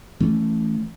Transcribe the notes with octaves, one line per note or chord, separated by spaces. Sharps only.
E3 A3 C#4